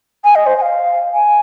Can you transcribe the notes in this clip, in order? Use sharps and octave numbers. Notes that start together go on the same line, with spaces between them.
G#5
D#5
C5
G#5
F5
G#5